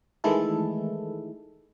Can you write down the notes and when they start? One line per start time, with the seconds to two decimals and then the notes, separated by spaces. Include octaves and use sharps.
0.24 D#3 E3 G#3 A3 E4 A4